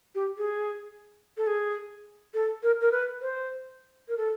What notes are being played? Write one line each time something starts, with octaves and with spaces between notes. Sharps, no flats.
G4
G#4
A4
G#4
A4
A#4
A#4
B4
C5
A#4
A4